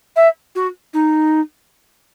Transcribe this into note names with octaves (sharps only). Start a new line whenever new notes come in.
E5
F#4
D#4